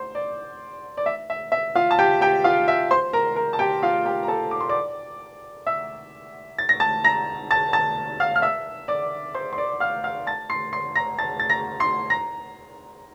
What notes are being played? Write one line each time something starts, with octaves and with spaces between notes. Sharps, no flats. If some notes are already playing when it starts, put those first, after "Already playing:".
Already playing: C5 C6
D5
D5
E5
E5
E5
F4 F5
A5
G4 G5
G4 G5
F4 F5
E5
C5 C6
A#4 A#5
A#4 A#5
A5
G4 G5
F4 F5
G4 G5
A#5
A4 A5
D6
C6
D5 D6
E5 E6
A6
A#6
A5 A6
A#5 A#6
A5 A6
A5 A6
F5 F6
F6
E5 E6
D5 D6
C5 C6
C6
D5 D6
F5 F6
F5 F6
A5 A6
C6 C7
C6 C7
A#5 A#6
A5 A6
A6
A#5 A#6
C6 C7
A#5 A#6